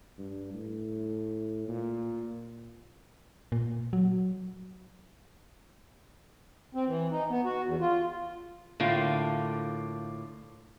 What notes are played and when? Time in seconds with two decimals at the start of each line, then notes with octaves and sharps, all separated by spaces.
0.18 G2
0.54 A2
1.68 A#2
3.52 A#2
3.93 F#3
6.75 C4
6.88 E3
7.12 D#4
7.30 B3
7.45 F#4
7.66 E2
7.81 F4
8.80 A2 D3 A#3 F4